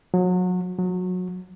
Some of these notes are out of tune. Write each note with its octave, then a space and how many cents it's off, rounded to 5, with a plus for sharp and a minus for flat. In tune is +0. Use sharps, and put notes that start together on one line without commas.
F#3 -30
F#3 -25